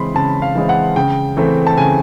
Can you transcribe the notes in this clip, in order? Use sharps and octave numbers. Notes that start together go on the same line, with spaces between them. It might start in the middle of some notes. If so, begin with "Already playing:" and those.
Already playing: C#3 E3 G#3 C4 B5 C6
C#3 A5
F5
E3 G#3 C4
F#5
C#3 G5
E3 A3 C4
A5
C#3 G#5